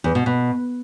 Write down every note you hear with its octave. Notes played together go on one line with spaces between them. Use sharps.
E2
B2
B2